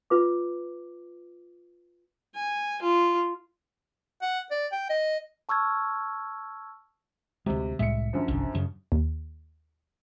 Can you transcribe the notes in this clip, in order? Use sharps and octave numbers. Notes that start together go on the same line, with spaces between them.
F4 B4 D6
G#5
F4
F#5
D5
G5
D#5
A5 C#6 E6 F6 G#6
D2 C3 G#3
C2 A2 G#3 E5 C#7
F#2 D3 F3
G1 C2
F#2 C#3
D#2